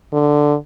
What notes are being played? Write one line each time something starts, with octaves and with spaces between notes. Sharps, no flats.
D3